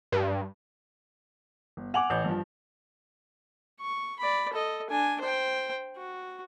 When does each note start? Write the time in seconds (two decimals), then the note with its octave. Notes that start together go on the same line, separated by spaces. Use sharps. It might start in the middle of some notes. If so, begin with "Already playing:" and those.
0.12 G2
1.77 G1
1.94 F#5 G#5 D6 F7 F#7
2.10 A1 G6
2.24 G2 F3
3.80 C#6
4.19 D5 B5
4.53 A4 D#5
4.90 D4 G#5
5.21 C5 G5
5.96 F#4